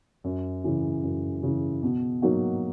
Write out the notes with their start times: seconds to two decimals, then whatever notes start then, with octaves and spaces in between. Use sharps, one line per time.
0.24 F#2
0.64 C#3 E3
1.03 F#2
1.43 C#3 E3
1.83 B2
2.22 F#3 A#3 D#4 F#4